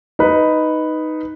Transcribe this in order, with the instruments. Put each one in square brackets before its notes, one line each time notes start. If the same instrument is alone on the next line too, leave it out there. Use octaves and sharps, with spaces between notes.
[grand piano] D#4 B4